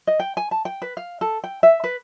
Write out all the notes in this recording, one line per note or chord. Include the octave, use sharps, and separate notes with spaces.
D#5
G5
G#5
A5
G5
B4
F5
A4
G5
E5
B4